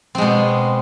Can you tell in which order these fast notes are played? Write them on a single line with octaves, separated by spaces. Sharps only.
C4 G#3 B2